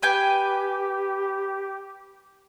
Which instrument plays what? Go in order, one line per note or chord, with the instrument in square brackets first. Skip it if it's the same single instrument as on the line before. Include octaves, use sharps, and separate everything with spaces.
[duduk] G4 [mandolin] B4 G5 G#5